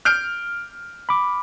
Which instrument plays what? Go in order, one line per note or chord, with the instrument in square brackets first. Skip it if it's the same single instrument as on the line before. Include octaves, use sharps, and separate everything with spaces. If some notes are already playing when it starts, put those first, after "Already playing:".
[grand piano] F6 G6 D7
[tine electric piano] B5 D6